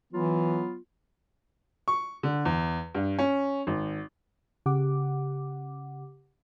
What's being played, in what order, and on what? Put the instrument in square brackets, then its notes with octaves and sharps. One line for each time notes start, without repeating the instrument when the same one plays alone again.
[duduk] E3 [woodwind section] F#3 B3 F4
[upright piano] C#6
D3
E2
G2
C#4
G#1
[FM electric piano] C#3 G4 F#5 D6